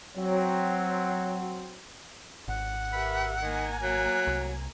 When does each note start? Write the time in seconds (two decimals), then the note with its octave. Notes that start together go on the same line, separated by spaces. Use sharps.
0.15 F#3 C4
2.48 G#1 F#5
2.93 G4 A#4 B4 E5
3.42 D#3 A#3 G#5 A#5
3.82 F#3 F#6
4.27 C2